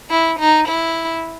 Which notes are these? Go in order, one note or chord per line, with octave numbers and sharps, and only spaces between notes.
E4
D#4
E4